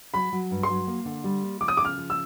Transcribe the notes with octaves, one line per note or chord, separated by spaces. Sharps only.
F#3 B5
F#3
G2
C6
F#3
A#3
D3
G3
A#3
F3 D6
D#6
C#3 D6
F6
F3
E6